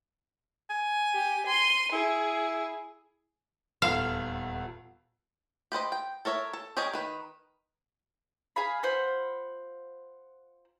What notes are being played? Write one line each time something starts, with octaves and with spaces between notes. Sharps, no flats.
G#5
G4
C6 D#7
E4 G#4
D#1 E2 A4 F5
G4 B4 C5 D#5
G5
A4 A#4 C#5 E5
A4
G4 G#4 A#4 C#5 D#5
D#3 B4
G#4 F5 B5
F4 C5 F#5 B5